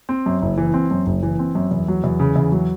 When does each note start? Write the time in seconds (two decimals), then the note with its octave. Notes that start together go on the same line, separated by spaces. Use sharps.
0.09 C4
0.26 F#2
0.42 F#1
0.57 E3
0.74 C4
0.91 F#2
1.06 F#1
1.23 E3
1.39 C4
1.55 F#2
1.71 E2
1.88 F#3
2.04 E2
2.19 C#3
2.36 E2
2.52 F#3